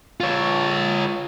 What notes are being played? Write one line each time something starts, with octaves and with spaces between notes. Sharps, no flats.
F4 C#5